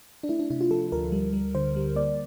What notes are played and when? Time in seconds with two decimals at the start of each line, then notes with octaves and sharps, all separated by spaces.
0.23 D4
0.29 A3 E4
0.39 D4
0.50 C3 E4
0.61 F4
0.71 F3 A4
0.92 D2 A#4
1.12 G3
1.33 G3
1.55 D3 C5
1.76 G3
1.96 A#3 D5